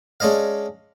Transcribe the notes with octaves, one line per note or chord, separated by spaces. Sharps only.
G#3 C#4 D4 D#5 F5